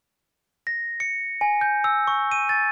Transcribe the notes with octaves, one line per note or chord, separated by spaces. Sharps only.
A#6
C#7
G#5
G6
E6
C#6
D#7
A6